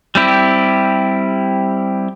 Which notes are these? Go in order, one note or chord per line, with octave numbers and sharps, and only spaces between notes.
G3 C4 E4 G4